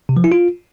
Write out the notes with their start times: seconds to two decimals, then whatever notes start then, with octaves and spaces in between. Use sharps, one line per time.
0.09 C3
0.17 F3
0.24 E4
0.32 F4